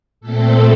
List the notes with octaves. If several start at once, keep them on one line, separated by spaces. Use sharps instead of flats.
A#2 A3 C4 A4